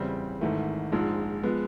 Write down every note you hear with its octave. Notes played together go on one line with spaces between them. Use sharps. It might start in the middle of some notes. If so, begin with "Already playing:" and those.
Already playing: E2 C#3 E3 G3 C4
G#1 G#2 E3 A3
A#1 G#2 F3 G#3
F3 G#3 B3